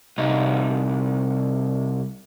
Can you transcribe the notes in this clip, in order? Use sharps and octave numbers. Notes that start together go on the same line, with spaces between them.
C2 D#4